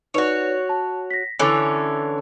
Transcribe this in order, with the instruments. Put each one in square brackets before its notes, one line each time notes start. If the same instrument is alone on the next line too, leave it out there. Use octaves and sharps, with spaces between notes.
[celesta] D#4 B4 D5 [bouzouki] F#4 C#5
[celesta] A5
A#6 B6
[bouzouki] D3 E3 C#4 [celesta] G#5 D6 A6